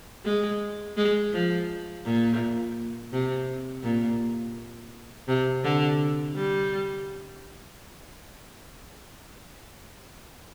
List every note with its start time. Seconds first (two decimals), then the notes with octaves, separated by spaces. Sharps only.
0.25 G#3
0.97 G#3
1.32 F3
2.05 A#2
3.12 C3
3.83 A#2
5.28 C3
5.63 D3
6.35 G3